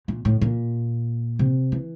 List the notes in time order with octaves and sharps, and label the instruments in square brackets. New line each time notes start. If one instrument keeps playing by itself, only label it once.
[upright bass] A#2
A2
A#2
C3
E3